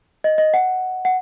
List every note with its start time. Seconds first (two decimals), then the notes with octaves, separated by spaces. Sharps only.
0.24 D#5
0.38 D#5
0.54 F#5
1.05 F#5